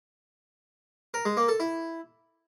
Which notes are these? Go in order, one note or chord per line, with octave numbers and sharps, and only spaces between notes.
A#4
G#3
A#3
A4
E4